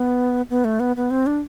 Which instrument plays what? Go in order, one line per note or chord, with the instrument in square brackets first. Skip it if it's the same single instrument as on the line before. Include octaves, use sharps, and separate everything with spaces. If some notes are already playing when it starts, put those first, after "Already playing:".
Already playing: [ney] B3
B3
A3
B3
B3
C4
D4